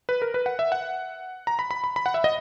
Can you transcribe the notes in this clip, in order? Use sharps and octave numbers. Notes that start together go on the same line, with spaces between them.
B4
A#4
B4
F#5
E5
F#5
A#5
B5
B5
B5
B5
F#5
E5
D#5